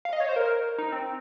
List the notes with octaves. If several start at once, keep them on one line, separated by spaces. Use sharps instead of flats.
F5
D#5
C#5
C5
A#4
D#4
C4